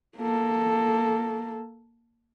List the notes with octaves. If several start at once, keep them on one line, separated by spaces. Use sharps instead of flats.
A#3 A4